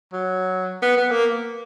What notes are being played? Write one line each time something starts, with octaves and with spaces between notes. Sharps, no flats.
F#3
B3
B3
A#3